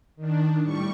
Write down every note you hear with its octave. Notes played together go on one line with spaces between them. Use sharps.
D#3 D4
A2 G3 C#6